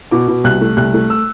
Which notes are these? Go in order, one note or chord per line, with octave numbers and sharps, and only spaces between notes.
B2 D6
B2
C2 F#6
A3
C2 F#6
A3
E6